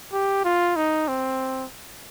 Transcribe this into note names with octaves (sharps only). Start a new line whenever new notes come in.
G4
F4
D#4
C4